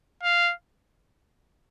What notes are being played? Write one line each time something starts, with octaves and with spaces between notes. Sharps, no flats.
F5